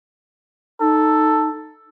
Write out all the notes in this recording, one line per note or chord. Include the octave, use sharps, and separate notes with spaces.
D#4 A4